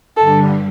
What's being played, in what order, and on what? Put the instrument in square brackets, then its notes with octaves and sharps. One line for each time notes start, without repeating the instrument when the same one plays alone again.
[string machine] G2 D3 G3 [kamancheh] A4